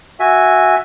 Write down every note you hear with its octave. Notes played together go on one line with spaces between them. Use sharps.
F#4 E5 G#5